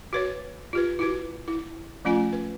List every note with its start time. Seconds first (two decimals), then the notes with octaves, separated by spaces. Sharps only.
0.13 F#4 B4 C#5
0.73 F4 G4 B4
0.99 E4 F#4 B4
1.48 E4
2.05 F3 A3 C#4 F4 G#5
2.33 B4